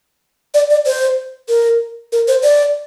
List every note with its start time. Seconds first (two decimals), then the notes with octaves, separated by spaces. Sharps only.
0.54 D5
0.70 D5
0.86 C5
1.49 A#4
2.12 A#4
2.28 C5
2.43 D5